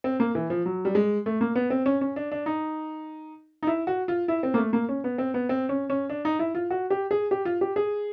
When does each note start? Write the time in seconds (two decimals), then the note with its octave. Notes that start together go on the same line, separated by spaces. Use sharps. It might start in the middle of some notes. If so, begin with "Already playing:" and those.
0.04 C4
0.20 A#3
0.35 E3
0.50 F3
0.66 F#3
0.85 G3
0.95 G#3
1.26 A3
1.41 A#3
1.55 B3
1.70 C4
1.86 C#4
2.01 C#4
2.16 D4
2.32 D4
2.46 D#4
3.63 D#4
3.67 E4
3.87 F#4
4.08 F4
4.28 E4
4.43 C4
4.54 A#3
4.58 A3
4.73 A#3
4.89 C#4
5.04 B3
5.18 C4
5.34 B3
5.49 C4
5.69 C#4
5.90 C#4
6.10 D4
6.25 D#4
6.39 E4
6.55 F4
6.70 F#4
6.90 G4
7.11 G#4
7.31 G4
7.45 F4
7.61 G4
7.76 G#4